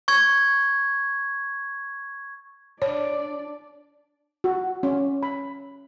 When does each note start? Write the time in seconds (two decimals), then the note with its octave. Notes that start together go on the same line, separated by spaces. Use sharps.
0.08 C#6 G#6
2.82 D4 C#5 D5
4.44 F#4
4.83 C#4
5.23 B5